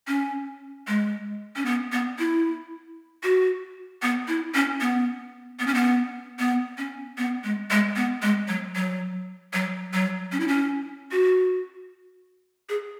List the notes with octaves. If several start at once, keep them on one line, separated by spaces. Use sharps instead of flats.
C#4
G#3
C#4
B3
B3
E4
F#4
B3
E4
C#4
B3
B3
C#4
B3
B3
C#4
B3
G#3
G#3
B3
G#3
F#3
F#3
F#3
F#3
C#4
E4
C#4
F#4
G#4